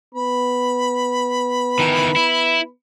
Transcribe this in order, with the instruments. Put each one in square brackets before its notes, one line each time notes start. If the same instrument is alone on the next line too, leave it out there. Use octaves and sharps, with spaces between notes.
[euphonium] B3 [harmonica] B5
[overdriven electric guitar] D#3 E3
E4